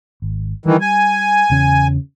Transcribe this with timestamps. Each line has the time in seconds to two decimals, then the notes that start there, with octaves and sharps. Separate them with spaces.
0.22 G#1
0.66 D#3 E3 G3
0.81 G#5
1.50 E2 C#3 C#4